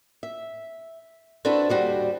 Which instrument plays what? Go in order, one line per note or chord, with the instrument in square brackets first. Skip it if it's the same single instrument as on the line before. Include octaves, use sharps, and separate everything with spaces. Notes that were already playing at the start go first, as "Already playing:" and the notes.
[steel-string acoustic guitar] E5
C4 D4 E4 F#4 A4 B4
D#2 G3 F#4 C5